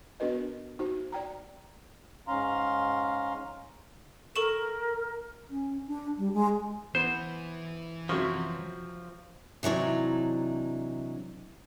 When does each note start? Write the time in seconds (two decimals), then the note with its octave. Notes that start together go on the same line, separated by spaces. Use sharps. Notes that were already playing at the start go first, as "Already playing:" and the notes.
0.20 B3 D4 F#4 A#4 B4 D#5
0.79 D#4 F#4 C5
1.12 D5 G5 A#5
2.28 G#2 C#4 F5 A#5 C6
4.36 A4 A#4 C#6 E7
5.50 C#4
5.87 D4
6.18 G3
6.34 G#3
6.95 E3 B3 C5
8.09 F#2 C3 F3 F#3
9.63 C3 E3 F#3 D4 D#4